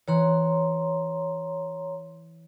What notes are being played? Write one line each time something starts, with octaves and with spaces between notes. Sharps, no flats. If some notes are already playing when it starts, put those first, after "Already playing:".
E3 C#5 A#5 C6 F#6